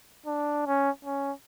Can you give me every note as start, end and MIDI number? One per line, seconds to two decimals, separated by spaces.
0.26 0.62 62
0.66 0.90 61
1.05 1.32 61